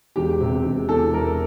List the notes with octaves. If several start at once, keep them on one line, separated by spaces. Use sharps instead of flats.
E1 G4
C3
E1
E2 A4
E1 A#4